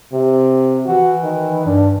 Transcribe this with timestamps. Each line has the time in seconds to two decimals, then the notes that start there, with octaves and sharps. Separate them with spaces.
0.13 C3
0.86 E3 F#4
1.23 D#3
1.66 G2 D4